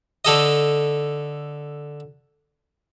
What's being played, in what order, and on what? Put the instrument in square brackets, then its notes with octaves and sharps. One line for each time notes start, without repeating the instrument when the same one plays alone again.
[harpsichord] D3 A4 D#5